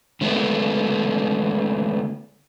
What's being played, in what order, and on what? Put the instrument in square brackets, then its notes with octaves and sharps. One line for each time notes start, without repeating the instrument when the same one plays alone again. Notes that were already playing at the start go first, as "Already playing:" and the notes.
[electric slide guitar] D3 G#3 A3 B3